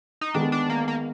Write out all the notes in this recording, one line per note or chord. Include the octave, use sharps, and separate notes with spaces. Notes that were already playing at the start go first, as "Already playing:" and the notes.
D#4
D#3 G#3 B3 D4
D4
A#3
A#3